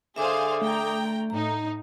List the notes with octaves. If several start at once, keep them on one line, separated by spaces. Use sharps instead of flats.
D3 G#4 C5 E5 F5 D6 D#6
A3 G5 A#5
A2 D#4 A#5